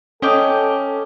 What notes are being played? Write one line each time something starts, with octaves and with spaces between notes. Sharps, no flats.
C#4 A4 D#5 G5 D6